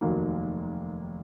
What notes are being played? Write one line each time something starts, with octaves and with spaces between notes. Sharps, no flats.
F1 D#2 D#3 F#3 A#3